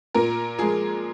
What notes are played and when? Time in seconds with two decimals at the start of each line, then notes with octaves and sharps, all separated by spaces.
0.15 A#2 A#4
0.59 F3 G#3 G#4